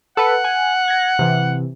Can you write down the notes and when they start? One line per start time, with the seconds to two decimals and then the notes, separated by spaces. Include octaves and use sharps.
0.17 A4 B4 F#5
0.44 G#5
0.88 G#6 A#6
1.19 C3 E3